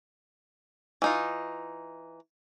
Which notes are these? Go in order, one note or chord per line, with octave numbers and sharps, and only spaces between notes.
E3 D#4 F4